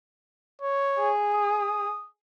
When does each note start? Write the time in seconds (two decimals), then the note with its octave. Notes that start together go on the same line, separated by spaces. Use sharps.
0.62 C#5
0.99 G#4
1.35 D#6